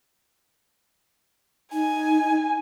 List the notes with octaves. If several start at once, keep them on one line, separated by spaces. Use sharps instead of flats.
D#4 G#5